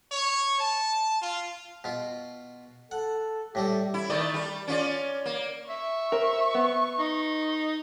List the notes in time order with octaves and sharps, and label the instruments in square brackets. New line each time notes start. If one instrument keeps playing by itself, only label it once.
[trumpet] C#5
A5
F4
[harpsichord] B2 F4
[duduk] A4 [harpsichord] F#5
[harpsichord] A2 G3 A4 [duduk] G4
[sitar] E4
D#3 A3 D5
G3
C#4 F4 D5
A#3
[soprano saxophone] E5 [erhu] C#6
[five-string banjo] A#4 C5
B3
[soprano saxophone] D#4